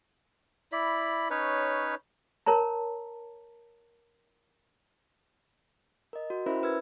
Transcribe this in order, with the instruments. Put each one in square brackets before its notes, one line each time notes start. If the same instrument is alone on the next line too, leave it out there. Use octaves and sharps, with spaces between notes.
[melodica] E4 D5 B5
C#4 D#4 B4 C#5
[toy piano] A#4 C#5 A5 A#5
[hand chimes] A#4 D#5
F#4
C#4 E4 A#4 C5 E5 B5
B4 E6 G#6